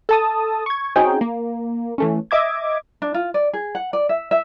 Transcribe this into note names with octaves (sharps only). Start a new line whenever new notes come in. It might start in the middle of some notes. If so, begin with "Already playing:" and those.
A4 A5 D#6
C#6 G#6
C4 C#4 D#4 F#4 G#4 G5
A#3
E3 A3 C#4
D#5 E5 D6 G#6
D4
F4
D5
G#4
F#5
D5
E5
E5